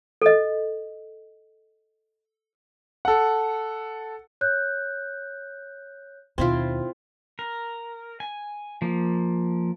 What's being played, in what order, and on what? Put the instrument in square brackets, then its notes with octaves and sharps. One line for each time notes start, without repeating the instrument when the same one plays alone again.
[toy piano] A4 D#5
[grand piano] A4 F#5
[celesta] C#5 F#6 G6
[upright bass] D#2 B2 [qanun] C4 E4 F4
[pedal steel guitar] A#4
G#5
F3 A#3